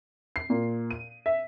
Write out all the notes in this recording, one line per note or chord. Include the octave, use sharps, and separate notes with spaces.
C7
A#2
D#7
E5